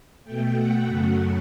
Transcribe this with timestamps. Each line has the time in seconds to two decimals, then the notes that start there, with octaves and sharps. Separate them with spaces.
0.24 B2 A3 G5
0.55 F#5
0.86 F#2 C#3 F#3 A3 F#5